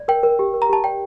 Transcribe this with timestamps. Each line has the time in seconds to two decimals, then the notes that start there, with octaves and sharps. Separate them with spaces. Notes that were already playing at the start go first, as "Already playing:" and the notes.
Already playing: D5
0.08 A#4 G5
0.23 A#4
0.39 G4
0.54 A#4
0.62 A#5
0.69 G4 A5
0.84 D5 G5